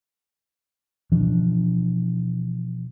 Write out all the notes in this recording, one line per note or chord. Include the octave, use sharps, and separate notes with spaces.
B2 E3 F3 D4